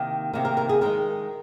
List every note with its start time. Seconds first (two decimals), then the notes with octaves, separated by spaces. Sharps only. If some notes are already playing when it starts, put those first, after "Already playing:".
Already playing: C3 D#3 A#3 D#4
0.33 C3 D#3 A#3 D#4
0.45 A#4
0.57 A#4
0.69 G#4
0.81 D#3 G#3 D#4 A#4